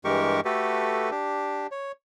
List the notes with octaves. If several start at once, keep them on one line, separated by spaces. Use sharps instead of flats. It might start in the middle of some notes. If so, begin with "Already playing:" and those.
G2 E3 G#3 G4 A#4 C#6
A3 F#4 G4 A4 B4
D4 G4
C#5